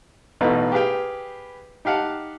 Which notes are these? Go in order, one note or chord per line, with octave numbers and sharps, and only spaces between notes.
A1 B2 A3 D#4 B4
G4 G#4 B4 F5 G5
D#4 G4 F5 F#5 A5